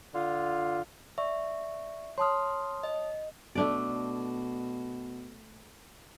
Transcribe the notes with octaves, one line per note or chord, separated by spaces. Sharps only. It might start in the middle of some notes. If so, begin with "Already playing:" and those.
D3 F4
D5 E5 C#6
C#5 A5 C6 D#6 F6
D#5
B2 A3 D4 D5